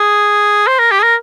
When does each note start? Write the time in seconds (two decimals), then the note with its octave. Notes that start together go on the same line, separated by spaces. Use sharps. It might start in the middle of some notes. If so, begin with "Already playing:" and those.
Already playing: G#4
0.67 C5
0.79 A#4
0.91 G4
0.99 G#4
1.03 A#4